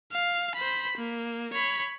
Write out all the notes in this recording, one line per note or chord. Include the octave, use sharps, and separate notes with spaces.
F5
C5 B5
A#3
C#5 B5